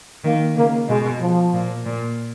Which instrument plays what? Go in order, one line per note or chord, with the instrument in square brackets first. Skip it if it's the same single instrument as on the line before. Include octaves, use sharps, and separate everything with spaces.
[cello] D#3 [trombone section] A#3
[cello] C#3 [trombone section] A#3
[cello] B2 [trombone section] G#3
[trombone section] F3
[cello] A#2
A#2